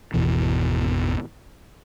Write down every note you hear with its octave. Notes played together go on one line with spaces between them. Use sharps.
G#1 E2 B2 E3